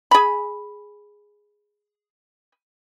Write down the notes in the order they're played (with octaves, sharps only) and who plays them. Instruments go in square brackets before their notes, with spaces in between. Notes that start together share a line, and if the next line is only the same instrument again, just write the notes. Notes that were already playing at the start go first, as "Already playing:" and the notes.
[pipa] G#4 B5